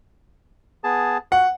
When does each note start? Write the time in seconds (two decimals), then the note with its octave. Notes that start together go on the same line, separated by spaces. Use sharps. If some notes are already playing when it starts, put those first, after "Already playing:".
0.84 B3 G#4 A5
1.32 F#4 F#5